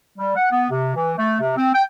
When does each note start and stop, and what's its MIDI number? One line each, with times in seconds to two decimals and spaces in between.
0.18 0.33 55
0.36 0.51 78
0.52 0.68 59
0.70 0.93 48
0.96 1.12 52
1.17 1.38 57
1.41 1.57 48
1.57 1.72 60
1.74 1.83 79